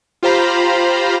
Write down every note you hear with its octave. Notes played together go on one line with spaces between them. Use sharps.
F4 G4 C5 F5 A#5 B5